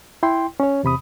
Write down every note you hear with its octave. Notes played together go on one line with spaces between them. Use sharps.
E4 G5 C6
C#4 C#5
E2 C3 B5 D#6